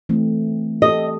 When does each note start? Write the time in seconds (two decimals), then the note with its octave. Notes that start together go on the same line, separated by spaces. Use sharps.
0.09 E3 A3 C4
0.82 G4 A4 D#5